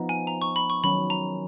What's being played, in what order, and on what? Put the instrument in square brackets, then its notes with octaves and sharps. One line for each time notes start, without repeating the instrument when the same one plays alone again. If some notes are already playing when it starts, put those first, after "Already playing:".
Already playing: [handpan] F3 B3 D#4
[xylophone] G#5
A#5
C#6
B5
C#6
[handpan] D#3 F#3 C#4 [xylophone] B5
[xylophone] A#5